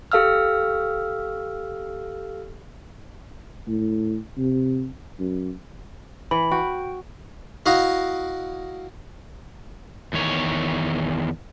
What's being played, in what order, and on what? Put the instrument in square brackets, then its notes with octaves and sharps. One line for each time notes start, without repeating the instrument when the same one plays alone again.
[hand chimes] G4 A4 F5 E6 F6
[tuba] A2
C3
F#2
[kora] E3 [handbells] B5
[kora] F#4 [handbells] G5
[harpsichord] E4 F#4 D#5 F5
[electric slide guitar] E2 D#3 C#5